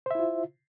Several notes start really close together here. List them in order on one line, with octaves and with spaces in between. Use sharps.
C5 E5 E4 F4